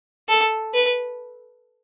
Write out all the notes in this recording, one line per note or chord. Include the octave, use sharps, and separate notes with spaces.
A4
B4